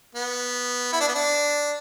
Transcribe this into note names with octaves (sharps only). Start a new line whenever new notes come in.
B3
E4
D4
B3
D4